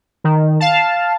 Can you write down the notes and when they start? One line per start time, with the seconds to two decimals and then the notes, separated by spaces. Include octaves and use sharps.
0.24 D#3
0.60 F5 A5